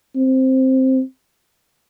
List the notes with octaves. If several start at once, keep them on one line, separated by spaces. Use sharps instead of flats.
C4